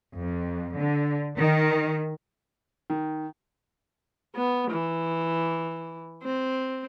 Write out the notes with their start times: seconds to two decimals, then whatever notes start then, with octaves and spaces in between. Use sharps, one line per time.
0.16 F2
0.78 D3
1.37 D#3
2.90 D#3
4.35 B3
4.70 E3
6.23 C4